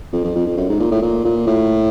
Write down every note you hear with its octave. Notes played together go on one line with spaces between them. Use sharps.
F2
F2
F2
F2
F#2
G#2
A#2
A2
A#2
A#2
A2